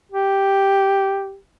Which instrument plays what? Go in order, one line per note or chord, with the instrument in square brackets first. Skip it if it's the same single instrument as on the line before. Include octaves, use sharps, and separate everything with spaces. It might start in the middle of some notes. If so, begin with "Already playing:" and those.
[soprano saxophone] G4